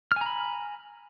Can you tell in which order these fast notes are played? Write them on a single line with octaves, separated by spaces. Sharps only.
F6 G#5 A#5 B5